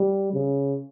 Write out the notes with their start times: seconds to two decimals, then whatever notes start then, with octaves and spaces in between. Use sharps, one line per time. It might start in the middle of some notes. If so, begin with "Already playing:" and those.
Already playing: G3
0.33 C#3